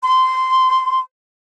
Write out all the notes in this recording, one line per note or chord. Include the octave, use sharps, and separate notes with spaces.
C6